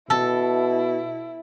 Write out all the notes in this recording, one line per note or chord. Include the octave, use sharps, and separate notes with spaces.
B2 E4 A4